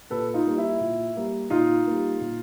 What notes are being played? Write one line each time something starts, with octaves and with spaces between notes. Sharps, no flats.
A#2 A4 B4
D#4 F4
G3 A#3
E4
A#2
G3 A#3
A#2 D#4 F4
G3 A#3
A#2